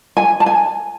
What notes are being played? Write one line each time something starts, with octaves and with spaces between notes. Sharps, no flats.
G#5
A5
G#5